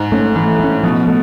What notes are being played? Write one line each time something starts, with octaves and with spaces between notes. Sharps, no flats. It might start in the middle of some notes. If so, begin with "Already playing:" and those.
Already playing: G#2
A3 C#4
A2 E3
A3 C#4
B2 F3
A3